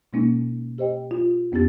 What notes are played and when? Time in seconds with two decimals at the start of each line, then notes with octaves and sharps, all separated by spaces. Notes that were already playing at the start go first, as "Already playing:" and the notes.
0.13 B2 G#3 A#3 C#4 D#4
0.78 G4 C5 D#5 G5
1.11 F4
1.52 F2 B3 C#4 G4 A6